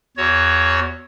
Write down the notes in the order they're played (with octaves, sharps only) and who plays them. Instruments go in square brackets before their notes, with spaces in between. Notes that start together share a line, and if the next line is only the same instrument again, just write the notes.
[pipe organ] E2 F#4 C#5